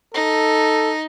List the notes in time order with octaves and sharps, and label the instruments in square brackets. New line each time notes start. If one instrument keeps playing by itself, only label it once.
[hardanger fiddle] D#4 [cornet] A4